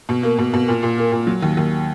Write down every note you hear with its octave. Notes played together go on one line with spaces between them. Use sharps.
B2
A#3
B2
B2
A#2
A#2
A#3
A#2
F#3
D#2
D#2